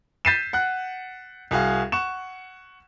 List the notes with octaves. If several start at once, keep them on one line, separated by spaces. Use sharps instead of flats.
G6 A6 B6 C7 D#7 E7
F#5 F#6
C2 F#4 G#4 F5
F#5 C#6 E7